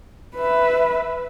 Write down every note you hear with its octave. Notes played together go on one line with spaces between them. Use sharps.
B4 E5